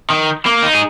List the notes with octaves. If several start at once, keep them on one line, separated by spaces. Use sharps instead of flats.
D#3
A#3
D#4
G#4